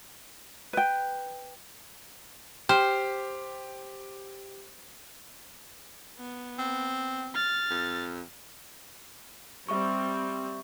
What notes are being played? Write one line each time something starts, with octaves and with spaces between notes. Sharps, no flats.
B4 G5
G4 C5 G5 F6
B3
C4
F6 A6
F2
G3 C4 E5 C#6